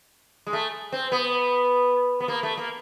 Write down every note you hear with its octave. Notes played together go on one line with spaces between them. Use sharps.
G#3
A3
C4
B3
B3
A#3
A3
A#3